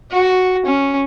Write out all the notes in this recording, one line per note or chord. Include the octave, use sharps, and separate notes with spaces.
F#4
C#4